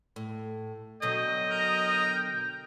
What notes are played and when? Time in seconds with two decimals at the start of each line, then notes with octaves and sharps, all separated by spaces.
0.16 A2
1.02 B2 D3 F#3 D#5 G5
1.51 A#4